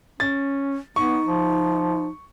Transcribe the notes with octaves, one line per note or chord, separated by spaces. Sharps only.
C#4 A6
B3 D#4 C#6
F3